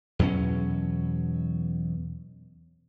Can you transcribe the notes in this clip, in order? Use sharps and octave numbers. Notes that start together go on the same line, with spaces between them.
E2 B2 F#3 C#4